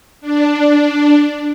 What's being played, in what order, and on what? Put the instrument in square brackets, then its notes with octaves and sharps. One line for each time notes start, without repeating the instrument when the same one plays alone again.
[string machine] D4